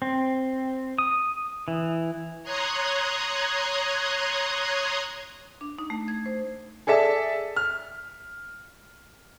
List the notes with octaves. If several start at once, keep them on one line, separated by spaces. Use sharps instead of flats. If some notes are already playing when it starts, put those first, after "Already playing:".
C4
D#6
E3
C#5 A#5 C6 D#6 F#6 G#6
D4
D#4
A3
G#6
C5
G#4 A4 D5 E5 A5
F6